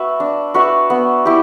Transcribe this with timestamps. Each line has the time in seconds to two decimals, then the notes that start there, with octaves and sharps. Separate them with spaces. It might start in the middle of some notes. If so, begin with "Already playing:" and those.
Already playing: F#4 B4 E5
0.20 D4
0.54 F#4 B4 E5
0.90 B3
1.25 E4 G4